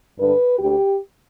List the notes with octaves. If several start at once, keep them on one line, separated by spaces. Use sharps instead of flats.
G2 D3 B4
D2 D3 G4